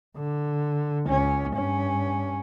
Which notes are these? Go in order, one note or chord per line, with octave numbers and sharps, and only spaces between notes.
D3
C#2 C#4
G2 C#4